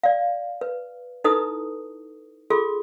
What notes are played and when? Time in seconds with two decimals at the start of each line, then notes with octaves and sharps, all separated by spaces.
0.03 D5 F5
0.61 B4
1.24 D#4 E4 A4 B4 D#6
2.50 F4 G#4 A4 C6 D6